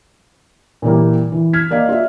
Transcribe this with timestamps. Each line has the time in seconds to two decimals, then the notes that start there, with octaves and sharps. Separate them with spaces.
0.82 A#2 E3 G3 A#3
1.32 E3
1.53 F6 G#6 B6
1.71 A#3 D5 D#5 F5
1.89 F4 D5 E5